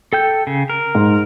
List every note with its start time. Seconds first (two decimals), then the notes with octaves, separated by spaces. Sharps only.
0.13 A4 G5 G6
0.47 C#3
0.70 A#4
0.95 G#2